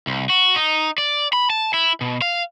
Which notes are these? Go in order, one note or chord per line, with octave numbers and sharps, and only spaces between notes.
C2
F#4
D#4
D5
B5
A5
E4
B2
F5